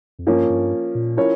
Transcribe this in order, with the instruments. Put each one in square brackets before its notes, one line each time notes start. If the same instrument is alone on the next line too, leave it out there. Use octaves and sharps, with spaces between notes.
[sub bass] F2
[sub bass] G2 [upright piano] F3 A#3 C#4
[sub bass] G2
A#2
[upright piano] F3 C#4 E4 A#4 C#5